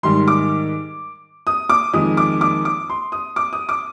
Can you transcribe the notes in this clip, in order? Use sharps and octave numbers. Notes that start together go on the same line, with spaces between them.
G#2 D#3 G3 C6
D6
D#6
D6
F2 D#3 G#3 D#6
D6
D6
D6
C6
D#6
D6
D#6
D6